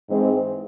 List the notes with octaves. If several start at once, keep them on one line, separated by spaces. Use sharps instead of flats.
G#2 E3 G#3 C4